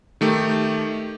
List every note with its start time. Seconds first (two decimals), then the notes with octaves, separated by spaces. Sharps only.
0.21 D#3 A3 G4